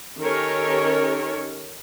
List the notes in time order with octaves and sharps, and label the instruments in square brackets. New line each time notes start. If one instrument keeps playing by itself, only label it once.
[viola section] D#3 C#4 G4 A4 A#4 C#5